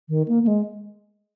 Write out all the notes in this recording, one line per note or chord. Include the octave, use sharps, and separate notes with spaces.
D#3
A#3
A#3
G#3